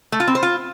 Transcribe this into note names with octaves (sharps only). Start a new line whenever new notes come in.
A3
F4
C4
C5
F4